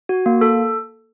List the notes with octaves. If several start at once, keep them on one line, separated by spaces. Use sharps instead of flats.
F#4
A#3
A4